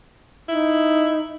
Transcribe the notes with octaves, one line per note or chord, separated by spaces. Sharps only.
D#4 E4